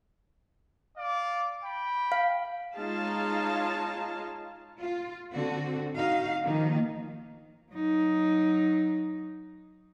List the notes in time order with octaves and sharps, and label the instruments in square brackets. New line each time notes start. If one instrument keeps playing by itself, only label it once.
[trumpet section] D5 F5
G5 B5
[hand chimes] F5
[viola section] G#3 D#4 F4 C#5 F5 A5
[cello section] F4
D3 C4 F#4
D#4 F#4 F5
D#3 F3 A#3 D#4
[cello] F#3 D#4